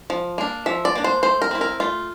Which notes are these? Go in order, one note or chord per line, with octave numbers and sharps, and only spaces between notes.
F3
A#3 D4
F3 E5
D5
A#3 D4
C5
A3 C5
A#4
C4 E4
A#4
A3 F4